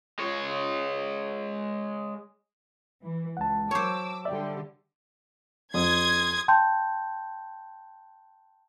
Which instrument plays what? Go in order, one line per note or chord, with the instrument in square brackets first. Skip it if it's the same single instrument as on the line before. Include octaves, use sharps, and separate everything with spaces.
[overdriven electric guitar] G#3 C#5
[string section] E3
[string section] C#2 [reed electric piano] F#5 A5
[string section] F#3 D6 E6 [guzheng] C5 C#5
[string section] D3 G3 G4 [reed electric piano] D5 E5
[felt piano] F2 [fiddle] C6 D#6 [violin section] G#6
[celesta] G5 A5 C6 G6